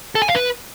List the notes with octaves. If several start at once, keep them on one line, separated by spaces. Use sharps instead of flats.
A4
G#5
F5
B4